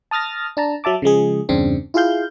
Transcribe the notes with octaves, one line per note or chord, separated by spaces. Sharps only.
A5 D#6 F6 A6 A#6
D4 A5 A#5
F#3 E5 A5 D6
C#3 F3 G#3 G#4
E2 G2 C#3 C4 D4
E4 F4 G#4 F5 G6